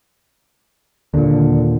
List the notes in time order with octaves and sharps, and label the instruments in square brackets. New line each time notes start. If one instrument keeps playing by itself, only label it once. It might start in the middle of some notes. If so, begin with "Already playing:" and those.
[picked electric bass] D#2 A#2 [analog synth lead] D3